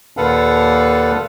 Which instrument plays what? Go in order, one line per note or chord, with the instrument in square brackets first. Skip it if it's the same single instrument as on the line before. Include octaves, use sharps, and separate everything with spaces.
[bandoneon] D#2 A#2 A4 B4 F5 F#5